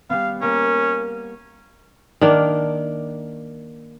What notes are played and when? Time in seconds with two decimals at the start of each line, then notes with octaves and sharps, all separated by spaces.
0.10 G3 B3 F5
0.41 A#3 C#4 A#4
2.21 D#3 A#3 D4